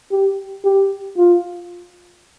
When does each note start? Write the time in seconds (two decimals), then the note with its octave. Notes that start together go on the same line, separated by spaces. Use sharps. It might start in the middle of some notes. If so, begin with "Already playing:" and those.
0.12 G4
0.65 G4
1.17 F4